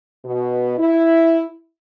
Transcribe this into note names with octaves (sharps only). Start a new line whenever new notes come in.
B2
E4